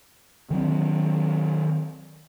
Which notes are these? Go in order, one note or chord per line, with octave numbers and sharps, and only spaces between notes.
D#3 F#3 B3 C4